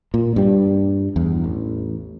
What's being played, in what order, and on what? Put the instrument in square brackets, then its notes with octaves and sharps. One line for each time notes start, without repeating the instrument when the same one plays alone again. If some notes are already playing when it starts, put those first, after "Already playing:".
[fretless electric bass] A#2
G2 G3
E2
A1